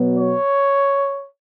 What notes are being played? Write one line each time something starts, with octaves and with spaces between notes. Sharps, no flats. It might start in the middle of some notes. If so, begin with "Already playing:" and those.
Already playing: B2 F#3 B3
C#5